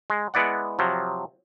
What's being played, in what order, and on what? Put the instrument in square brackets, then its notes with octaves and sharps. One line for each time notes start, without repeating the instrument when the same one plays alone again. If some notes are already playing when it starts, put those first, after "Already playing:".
[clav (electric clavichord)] G#3
G#3 B3 E4 D5 F#5
C3 F3 F#3